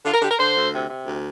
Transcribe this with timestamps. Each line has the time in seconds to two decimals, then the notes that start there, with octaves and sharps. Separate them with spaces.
0.05 D3 F4
0.14 A#4
0.22 D3 G4
0.30 A#4
0.39 D3 C5
0.55 D2
0.72 C3
0.89 C3
1.06 D2